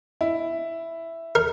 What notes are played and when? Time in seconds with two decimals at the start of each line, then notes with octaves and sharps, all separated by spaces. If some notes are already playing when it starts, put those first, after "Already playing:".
0.21 E4
1.35 A#4